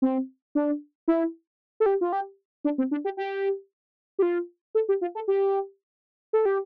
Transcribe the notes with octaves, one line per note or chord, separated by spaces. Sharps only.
C4
D4
E4
A4
G4
F4
G4
D4
C4
D4
G4
G4
G4
F4
A4
G4
F4
A4
G4
A4
G4